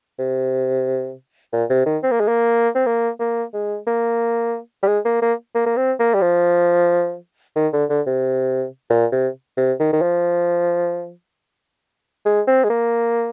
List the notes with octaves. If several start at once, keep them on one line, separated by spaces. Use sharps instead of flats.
C3
A#2
C3
D#3
C4
A#3
G#3
A#3
C4
A#3
A#3
G#3
A#3
G3
G#3
A#3
A#3
A#3
A#3
C4
A#3
G3
F3
D#3
D3
D3
C3
A#2
C3
C3
D#3
D#3
F3
G#3
C4
G#3
A#3